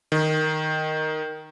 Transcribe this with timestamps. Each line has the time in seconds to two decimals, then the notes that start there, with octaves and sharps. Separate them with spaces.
0.12 D#3